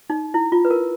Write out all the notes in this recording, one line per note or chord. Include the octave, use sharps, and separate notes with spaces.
D#4
E4
F4
B4
A#4